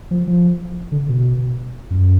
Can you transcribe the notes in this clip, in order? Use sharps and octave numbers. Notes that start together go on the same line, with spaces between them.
F3
F3
D3
B2
F#2